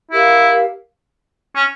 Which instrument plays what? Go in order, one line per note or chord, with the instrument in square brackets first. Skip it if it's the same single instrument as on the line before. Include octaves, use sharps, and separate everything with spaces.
[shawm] E4 [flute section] G4 A#4 F5
[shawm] C#4